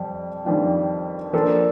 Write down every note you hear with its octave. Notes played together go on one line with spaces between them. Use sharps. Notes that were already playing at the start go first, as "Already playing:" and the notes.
Already playing: F2 G3
F2 D#3 G3 D4 F4
F3 A#3 D4 A4